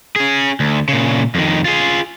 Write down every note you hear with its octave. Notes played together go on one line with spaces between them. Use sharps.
C#4 G#4
D2
A#2 C#3
F2 D#3
F4 G#4